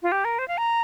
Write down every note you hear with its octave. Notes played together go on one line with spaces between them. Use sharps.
F4
G4
A#4
C5
F5
A#5